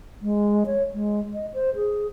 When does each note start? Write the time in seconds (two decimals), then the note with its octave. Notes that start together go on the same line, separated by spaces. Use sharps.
0.22 G#3
0.66 C#5
0.93 G#3
1.34 D#5
1.54 C5
1.75 G#4